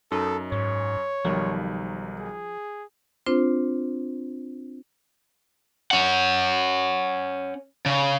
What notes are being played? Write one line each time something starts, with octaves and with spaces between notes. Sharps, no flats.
F#2 D#4 A4
G#2 C#5
B1 D#3 F3 G3
G#4
C4 D4 F4 C5
C#4 F#5
C#3